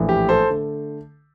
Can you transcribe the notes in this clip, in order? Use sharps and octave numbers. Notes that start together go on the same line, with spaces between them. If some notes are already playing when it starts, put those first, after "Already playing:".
Already playing: A#1 A2 E3
G4
A4 C5
D3 A3